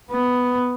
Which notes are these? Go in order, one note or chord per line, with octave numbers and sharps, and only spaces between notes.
B3